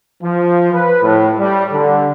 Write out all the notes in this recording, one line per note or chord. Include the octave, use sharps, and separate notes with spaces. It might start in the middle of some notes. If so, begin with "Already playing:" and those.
F3
B4
A2
G3
D3